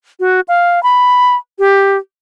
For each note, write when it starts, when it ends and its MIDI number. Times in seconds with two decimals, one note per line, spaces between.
0.20 0.41 66
0.48 0.82 77
0.83 1.35 83
1.59 1.97 67